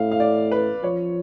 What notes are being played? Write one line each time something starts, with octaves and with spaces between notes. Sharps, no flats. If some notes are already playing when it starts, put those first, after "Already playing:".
Already playing: A2 F5
F5
D5
B4
F3 C#5